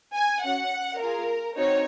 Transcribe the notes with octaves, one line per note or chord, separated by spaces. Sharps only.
G#5
C#4 F#4 F#5
A#3 F4 G#4 A#4
C4 D#4 F#4 C#5